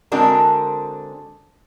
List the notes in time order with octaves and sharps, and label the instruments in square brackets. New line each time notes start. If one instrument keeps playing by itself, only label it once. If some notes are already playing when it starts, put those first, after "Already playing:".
[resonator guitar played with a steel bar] D3 G#3 C4 D4 F#4 A#4